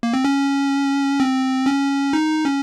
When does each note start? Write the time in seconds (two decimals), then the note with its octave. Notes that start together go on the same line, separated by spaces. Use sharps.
0.03 A#3
0.14 C4
0.25 C#4
1.20 C4
1.66 C#4
2.13 D#4
2.45 C#4